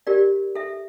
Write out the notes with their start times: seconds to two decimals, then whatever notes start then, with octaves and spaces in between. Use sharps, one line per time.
0.07 G4 A#4 D5
0.55 A4 E5